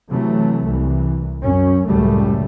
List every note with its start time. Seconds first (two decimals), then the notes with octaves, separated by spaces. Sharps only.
0.11 C3 E3 F#3 A3
0.69 C2 E3
1.41 F#2 C#4
1.89 C#2 F#2 A2 C#3 G3 A3